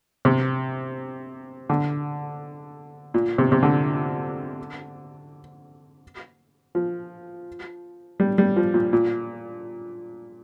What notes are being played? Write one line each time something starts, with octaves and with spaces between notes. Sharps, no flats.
C3
D3
A#2
C3
C3
D3
F3
G3
G3
F3
A#2
A#2